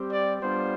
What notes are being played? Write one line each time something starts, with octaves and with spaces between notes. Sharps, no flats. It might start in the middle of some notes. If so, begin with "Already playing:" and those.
Already playing: G3 C4 G4
D5
G3 B3 D4 F4 C5